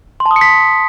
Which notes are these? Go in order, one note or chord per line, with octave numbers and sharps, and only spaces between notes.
C6
A5
D#6
C#7
B6